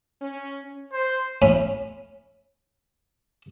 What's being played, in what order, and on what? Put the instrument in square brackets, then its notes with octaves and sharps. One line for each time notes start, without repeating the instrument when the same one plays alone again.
[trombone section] C#4
[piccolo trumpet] C5
[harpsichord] A2 C#4 B5